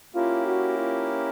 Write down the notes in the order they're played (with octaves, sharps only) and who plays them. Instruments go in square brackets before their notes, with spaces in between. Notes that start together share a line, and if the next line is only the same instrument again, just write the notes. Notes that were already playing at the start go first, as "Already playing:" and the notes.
[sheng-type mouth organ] A#3 C#4 E4 G4 A#4 [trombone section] F4
[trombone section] F#4
F4